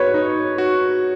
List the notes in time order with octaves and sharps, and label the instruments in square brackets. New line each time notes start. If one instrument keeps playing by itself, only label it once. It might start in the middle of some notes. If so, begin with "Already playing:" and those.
Already playing: [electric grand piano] F#4 [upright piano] B4 C#5
[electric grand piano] D#4
F#4